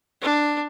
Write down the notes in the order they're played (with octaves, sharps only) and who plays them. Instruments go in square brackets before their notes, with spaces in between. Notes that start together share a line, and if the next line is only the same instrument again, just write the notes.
[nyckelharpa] D4